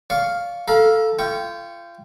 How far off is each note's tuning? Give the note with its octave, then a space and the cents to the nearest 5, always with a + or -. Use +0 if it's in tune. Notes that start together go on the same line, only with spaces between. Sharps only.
D5 -25 F5 +0 C#6 +0
A4 +0 F5 +0 A#5 +40
F4 -35 G5 +0 C#6 +0